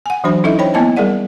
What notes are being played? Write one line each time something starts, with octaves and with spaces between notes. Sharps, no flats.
F#5 G#5
E3 F#3 D4 F#4 C5 B5
C#4 D#4 E4 A4 D#5 E5
C5 C#5 G5 B5
A#3 B3 E4 D#5 G#5 A5
G3 G#4 A#4 D5 F#5